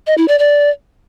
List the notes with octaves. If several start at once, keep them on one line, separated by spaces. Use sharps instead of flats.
D#5
E4
D5
D5